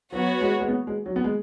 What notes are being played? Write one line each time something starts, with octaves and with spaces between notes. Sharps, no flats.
F#3 B3 F#4 C#5
G#3
G#3
B3
G#3
F#3
B3
G#3